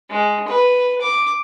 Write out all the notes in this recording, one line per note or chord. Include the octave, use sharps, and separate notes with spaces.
G#3
B4
D6